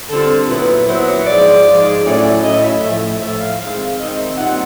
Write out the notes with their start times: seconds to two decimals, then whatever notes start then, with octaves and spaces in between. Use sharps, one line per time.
0.10 D3 G3 C4 F4 A4
0.49 A#2 F#3 B3 E4 B4
0.88 A#2 F#3 B3 E4 C5
1.08 C#5
1.26 G#2 F3 G#3 D5
1.65 G#2 F3 G#3
2.04 A2 F#3 A3 C#4 E4 D5
2.43 A2 F#3 A3 C#4 E4 D#5
2.62 E5
2.81 A2 F3 A3 E5
3.20 A2 F3 A3 E5
3.40 F5
3.58 D#3 G#3 C4 F5
3.78 F5
3.97 D#3 G#3 C4 D#5
4.17 E5
4.37 A#2 G3 C4 D#4 F#5